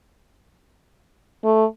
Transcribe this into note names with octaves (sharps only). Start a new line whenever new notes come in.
A3